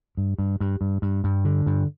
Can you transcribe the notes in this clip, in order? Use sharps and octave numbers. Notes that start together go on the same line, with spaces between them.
G2
G2
G2
G2
G2
G2
D3
G2